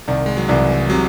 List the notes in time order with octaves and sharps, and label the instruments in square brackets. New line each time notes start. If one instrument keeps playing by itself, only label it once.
[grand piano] C2 [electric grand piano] D#3
[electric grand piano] G#3
F#3
[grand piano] C2 [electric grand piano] E3
[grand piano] C3 [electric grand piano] F#3